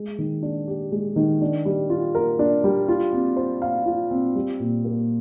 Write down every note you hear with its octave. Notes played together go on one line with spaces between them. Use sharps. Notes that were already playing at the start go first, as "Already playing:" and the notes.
Already playing: G#3
D#3
D4
G4
G#3
D#3
D4
G3
F4
A#4
D4
G3
F4
C4
C5
F5
F4
C4
G3
A#2
A#3